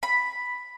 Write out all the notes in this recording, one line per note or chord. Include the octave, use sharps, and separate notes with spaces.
B5